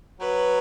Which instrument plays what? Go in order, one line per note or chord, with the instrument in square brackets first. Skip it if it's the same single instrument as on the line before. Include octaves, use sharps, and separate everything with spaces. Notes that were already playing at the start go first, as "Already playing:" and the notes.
[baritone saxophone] F#3 [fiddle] B4